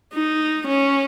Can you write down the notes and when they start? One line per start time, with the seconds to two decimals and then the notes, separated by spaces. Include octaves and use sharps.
0.13 D#4
0.67 C#4